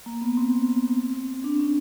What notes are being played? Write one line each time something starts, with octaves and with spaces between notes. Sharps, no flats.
A#3
B3
C4
D4
C#4